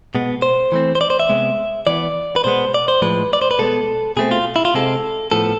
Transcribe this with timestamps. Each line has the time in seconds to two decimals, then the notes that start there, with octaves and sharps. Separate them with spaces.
0.15 B2 G#3 B3
0.42 C5
0.72 E3 A3 C4
0.95 C5
1.01 D5
1.10 C5
1.20 E5
1.29 C3 G#3 B3
1.87 E3 B3 D5
2.36 B4
2.44 B2 G#3 B3 C5
2.74 D5
2.88 C5
3.02 A2 F3 G#3 B4
3.33 D5
3.42 C5
3.51 B4
3.59 B2 G#3 B3 A4
4.17 B2 A3 C4 G#4
4.31 F4
4.56 E4
4.65 F4
4.74 C3 G#3 C4 A4
5.32 A2 F3 B3 A4